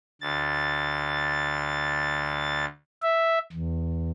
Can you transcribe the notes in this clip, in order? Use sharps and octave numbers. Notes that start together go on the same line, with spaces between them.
D2 A6
E5
E2